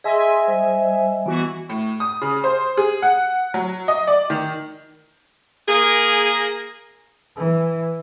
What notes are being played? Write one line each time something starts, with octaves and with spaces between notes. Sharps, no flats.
G#4 D#5 E5 G#5 C6 E6
G3 C5
E3 B3 F#4
A2
D#6
C#3
C5
G#4
F#5
F#3
D#5
D5
D#3
A#3 G#4
E3